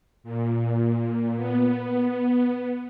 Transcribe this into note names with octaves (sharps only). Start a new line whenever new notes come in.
A#2
B3